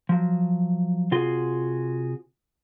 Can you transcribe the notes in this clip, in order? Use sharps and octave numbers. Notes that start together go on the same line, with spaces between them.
F3 F#3
C3 F4 F#4 G#4 C6